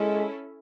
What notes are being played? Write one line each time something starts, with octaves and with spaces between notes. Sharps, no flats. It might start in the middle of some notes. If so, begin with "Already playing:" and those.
Already playing: G#3 C#4 E4 A4